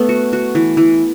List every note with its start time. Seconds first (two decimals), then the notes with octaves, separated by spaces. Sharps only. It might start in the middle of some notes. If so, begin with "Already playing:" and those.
Already playing: A3 B3
0.09 F#4
0.33 F#4
0.55 E3
0.77 E3